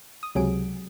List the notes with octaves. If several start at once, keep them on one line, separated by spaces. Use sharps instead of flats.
D#6
C#2 C3 F#3 G#4 D7